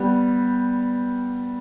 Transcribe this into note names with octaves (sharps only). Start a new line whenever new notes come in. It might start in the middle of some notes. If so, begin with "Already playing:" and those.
Already playing: G3 B3